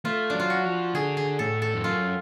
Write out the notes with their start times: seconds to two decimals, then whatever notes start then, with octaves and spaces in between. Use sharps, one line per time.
0.05 A3 F4
0.30 F#3 D4
0.39 F4
0.50 F#4
0.65 F3
0.94 D3 G#4
1.17 G#4
1.39 A2 A4
1.62 A4
1.74 F2
1.84 F#2 F4